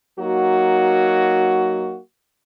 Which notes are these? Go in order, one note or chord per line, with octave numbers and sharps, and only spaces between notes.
F#3 A#3 D#4 F#4